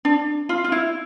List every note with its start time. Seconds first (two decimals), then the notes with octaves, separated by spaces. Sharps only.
0.05 D4
0.49 F4
0.64 F4
0.72 E4